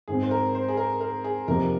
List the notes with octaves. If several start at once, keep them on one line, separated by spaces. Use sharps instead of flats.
G#2 D#3 C4 G#4
C5
A#4
C5
G#4
A#4
A#4
G#4
F2 C3 F3 A#3 D#4 A#4